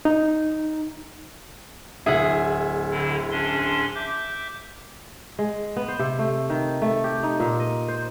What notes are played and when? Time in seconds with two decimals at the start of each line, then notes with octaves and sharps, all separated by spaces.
0.05 D#4
2.06 D1 G#4 E5 F#5
2.91 D3 E4
3.31 C#4 D4 C6
3.95 E5 D6 G6
5.39 G#3
5.76 B3
5.88 C5
5.99 C3
6.19 A3
6.50 D#3
6.82 A3
7.04 G4
7.23 D#4
7.40 A#2
7.60 D#5
7.88 C5